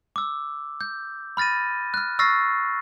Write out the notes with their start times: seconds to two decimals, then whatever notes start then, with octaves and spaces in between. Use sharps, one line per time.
0.16 D6 E6
0.81 G6
1.37 B5 F6 A6 A#6 D#7
1.94 F6 F#6
2.19 C#6 E6 F6 A6 A#6 C7